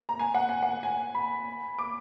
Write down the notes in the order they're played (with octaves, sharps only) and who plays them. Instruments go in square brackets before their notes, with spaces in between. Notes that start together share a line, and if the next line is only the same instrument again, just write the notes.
[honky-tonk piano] A#5
G#5
F#5
G#5
F#5
G#5
B5
D6